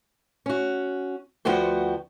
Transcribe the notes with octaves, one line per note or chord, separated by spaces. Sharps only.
C#4 F#4
D2 F3 B3 F#4 G5